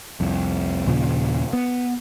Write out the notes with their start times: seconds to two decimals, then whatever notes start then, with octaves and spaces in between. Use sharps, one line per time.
0.20 C2 F2
0.87 D#2 A#2 C#3 F3
1.53 B3